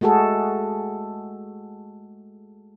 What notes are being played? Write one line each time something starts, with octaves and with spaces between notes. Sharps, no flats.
G#3 A3 F#4 G#4 A4